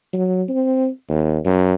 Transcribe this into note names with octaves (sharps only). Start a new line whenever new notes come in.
F#3
C4
D#2
F#2